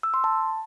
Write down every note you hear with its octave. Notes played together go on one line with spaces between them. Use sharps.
E6
C6
A5